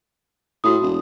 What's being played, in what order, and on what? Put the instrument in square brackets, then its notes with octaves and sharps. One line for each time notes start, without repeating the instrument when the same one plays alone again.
[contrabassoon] A2 [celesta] F#4 D#6
[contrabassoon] E1